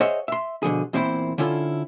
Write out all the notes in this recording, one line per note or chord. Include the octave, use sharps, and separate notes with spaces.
G#4 C5 C#5 D#5 E5 F#5
E5 C6
B2 D3 F3 G#4
E2 A#2 C4 D4 E4 C5
D3 C#4 E4 F4 A4